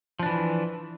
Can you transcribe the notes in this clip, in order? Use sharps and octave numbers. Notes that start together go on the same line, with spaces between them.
E3 F3 D4